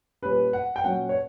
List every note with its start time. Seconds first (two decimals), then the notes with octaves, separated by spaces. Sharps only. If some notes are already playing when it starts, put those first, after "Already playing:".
0.22 A#2 G3 C#4 B4
0.53 F#5
0.76 G5
0.84 A#2 F#3 C#4 F#5
1.09 C#5